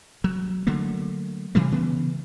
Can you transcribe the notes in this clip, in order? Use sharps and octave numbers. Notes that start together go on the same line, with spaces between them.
F#3
D3 F#3 A3 A#3
C3 E3 G3 A3
C#3 E3 B3